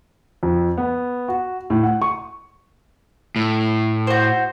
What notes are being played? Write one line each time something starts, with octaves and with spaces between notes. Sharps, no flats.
F2
B3
F#4
A2
F#5
C#6
A2
F#4 C5